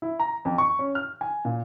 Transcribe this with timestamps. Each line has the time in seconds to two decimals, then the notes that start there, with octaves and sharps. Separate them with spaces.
0.02 E4
0.20 A#5
0.45 F2
0.58 C#6
0.79 C#4
0.95 F6
1.21 G#5
1.45 A#2